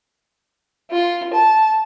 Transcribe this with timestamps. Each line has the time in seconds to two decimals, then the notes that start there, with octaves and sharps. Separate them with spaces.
0.91 F4
1.33 A5